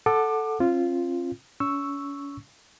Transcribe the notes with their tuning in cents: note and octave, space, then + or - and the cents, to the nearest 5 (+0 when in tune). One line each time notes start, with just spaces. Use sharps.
A4 +0 F#5 +0 D6 +25
C4 +45 F4 -10
C#4 +35 C#6 +0 E6 +0